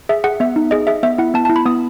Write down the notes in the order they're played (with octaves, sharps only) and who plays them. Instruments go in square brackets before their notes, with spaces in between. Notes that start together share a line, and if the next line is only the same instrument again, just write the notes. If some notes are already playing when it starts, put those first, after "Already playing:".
[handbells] G#4 E5
G#4 F#5
B3 E5
D#4
G#4 D#5
G#4 E5
B3 E5
E4 F#5
B3 A5
A5
E4
B5
B3 D#6